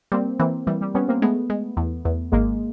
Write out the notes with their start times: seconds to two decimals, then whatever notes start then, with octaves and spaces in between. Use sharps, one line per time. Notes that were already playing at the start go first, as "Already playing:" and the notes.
0.12 G3 A#3 C4
0.39 E3 A#3 C4
0.67 E3 G3
0.81 G3
0.94 G3 B3 C#4
1.08 A#3 C4
1.22 G#3 A3 B3
1.50 G#3
1.77 E2
2.05 E2
2.32 G#1 G#3 A#3